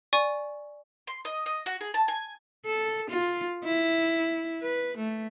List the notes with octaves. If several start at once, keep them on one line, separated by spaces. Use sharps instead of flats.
D5 G#5 C#6
C6
D#5
D#5
F#4
G#4
A5
G#5
A4
F4
E4
B4
A3